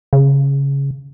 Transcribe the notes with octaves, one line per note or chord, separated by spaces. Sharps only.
C#3